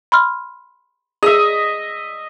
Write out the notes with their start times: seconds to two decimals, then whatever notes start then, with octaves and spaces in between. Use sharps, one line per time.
0.12 B5 C6 F6
1.23 G#4 D#5 E5